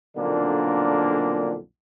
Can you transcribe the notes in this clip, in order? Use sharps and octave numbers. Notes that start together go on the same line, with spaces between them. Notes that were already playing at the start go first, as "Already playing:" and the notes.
B1 F2 A#2 D3 A#3 D4